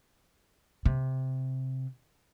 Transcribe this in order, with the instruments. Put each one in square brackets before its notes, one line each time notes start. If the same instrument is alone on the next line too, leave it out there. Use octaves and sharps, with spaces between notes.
[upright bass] C3